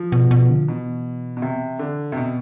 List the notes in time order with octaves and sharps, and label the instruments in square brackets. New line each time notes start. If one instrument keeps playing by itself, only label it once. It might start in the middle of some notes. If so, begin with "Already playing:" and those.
Already playing: [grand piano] F3
[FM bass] B2
B2
D3
[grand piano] B2 [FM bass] E3
[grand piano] B2
C3
D3
C3
B2